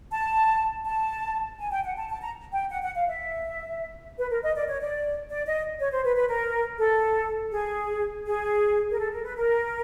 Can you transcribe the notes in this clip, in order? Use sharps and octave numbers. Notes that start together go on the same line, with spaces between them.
A5
A5
G#5
G5
F#5
A5
A5
A#5
G5
F#5
F#5
F5
E5
B4
A#4
D#5
D5
C#5
D5
D5
D#5
C#5
C5
B4
B4
A#4
A4
G#4
G#4
A#4
A4
A#4
B4
A#4